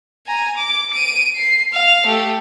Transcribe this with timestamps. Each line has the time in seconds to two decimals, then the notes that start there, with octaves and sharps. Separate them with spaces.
0.27 G#5 A#5
0.57 D6
0.93 D7 D#7
1.36 C7
1.73 F5 F7
2.06 A3 G4